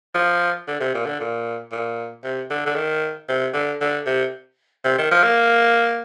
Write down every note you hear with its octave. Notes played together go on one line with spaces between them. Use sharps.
F3
D3
C3
A#2
D3
A#2
A#2
C3
D3
D3
D#3
C3
D3
D3
C3
C3
D#3
F3
A#3